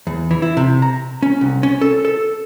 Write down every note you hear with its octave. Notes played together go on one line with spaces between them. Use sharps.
E2
E3
E4
C3
A#5
C#4
C2
C#4
A4
A4